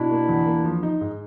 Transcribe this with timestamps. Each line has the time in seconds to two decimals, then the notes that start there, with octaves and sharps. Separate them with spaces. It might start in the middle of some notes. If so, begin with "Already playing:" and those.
Already playing: B2 D4 E4
0.11 A#3
0.29 E2
0.46 A#3
0.64 F3
0.83 D#4
1.01 G#2